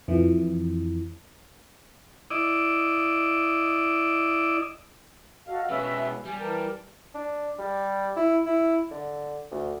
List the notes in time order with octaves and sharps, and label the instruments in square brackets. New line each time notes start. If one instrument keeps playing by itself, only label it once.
[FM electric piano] F2 E3
[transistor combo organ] E4 D5 D#5
[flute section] F#4 A4 D#5 [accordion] F5
[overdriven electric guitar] B2 G#3 [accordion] C#4 B4 [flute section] D#5 E5 E6
[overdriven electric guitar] G3 [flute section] G#5
[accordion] E3 A#4 [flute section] A5
[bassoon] D4
G3
E4
E4
D3
D2